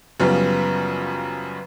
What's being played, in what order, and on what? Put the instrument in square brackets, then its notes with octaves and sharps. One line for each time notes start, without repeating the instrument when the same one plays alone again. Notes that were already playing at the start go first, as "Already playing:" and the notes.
[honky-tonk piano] F#2 C#3 F3 G3 B3